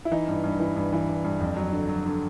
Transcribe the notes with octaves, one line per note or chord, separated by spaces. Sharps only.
E4
E3 D#4
G2
G2
E3
G2
E3
G2
G2
F2
F#3
D3
F#3
D3